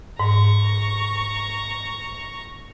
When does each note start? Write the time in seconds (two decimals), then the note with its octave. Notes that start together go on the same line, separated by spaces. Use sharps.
0.20 G#2 A#5 C#6